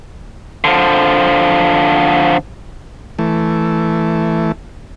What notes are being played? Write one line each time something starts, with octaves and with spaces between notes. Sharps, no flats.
D3 F3
E3 A3